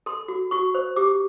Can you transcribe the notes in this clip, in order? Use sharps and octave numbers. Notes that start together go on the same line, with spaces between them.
A4 C6
F#4
F#4 C#6
C5
G4 D6